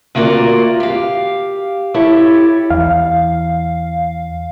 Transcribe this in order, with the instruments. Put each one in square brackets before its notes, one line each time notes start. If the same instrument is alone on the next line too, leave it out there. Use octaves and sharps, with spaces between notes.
[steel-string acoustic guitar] D2 A#3 F4 F#4 A#4 D5
G4 F5
E4 G4 A4 C#5
[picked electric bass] E2 [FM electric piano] F5